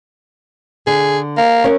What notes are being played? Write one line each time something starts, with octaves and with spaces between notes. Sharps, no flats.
D3 G#4
A#3
C#4 A#4 C#5